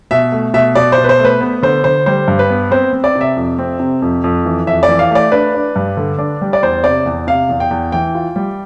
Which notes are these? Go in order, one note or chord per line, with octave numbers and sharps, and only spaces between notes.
B2 E5
A3
B2 E5
B2 D5
C5
B2
B4
C5
A3
B4
B3
D3 C5
D3 C5
G3 C5
G2
B4
B3
C4 C5
C4
D5
C3
E5
F2
C4
C3
F2
F2
E3
F2 E5
D5
E3
F5
A3 D5
D4 B4
D4
G2
D3
D4
G3
D5
E2 C5
C3 D5
E2
C3 F5
E2
G5
E2
E3 G5
F4
G3